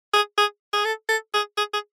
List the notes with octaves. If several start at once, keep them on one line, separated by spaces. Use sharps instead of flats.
G#4
G#4
G#4
A4
A4
G#4
G#4
G#4